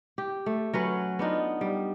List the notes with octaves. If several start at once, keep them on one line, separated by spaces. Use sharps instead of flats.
G4
A3
F#3 C#4 B4
B3 D4 D#4 F4
G3